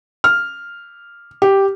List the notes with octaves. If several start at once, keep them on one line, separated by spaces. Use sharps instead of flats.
F6
G4